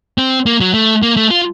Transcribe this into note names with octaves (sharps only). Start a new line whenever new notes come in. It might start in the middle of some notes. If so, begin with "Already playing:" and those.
C4
A#3
F#3
A3
A#3
A3
F4